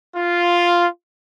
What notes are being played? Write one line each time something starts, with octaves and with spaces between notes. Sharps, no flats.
F4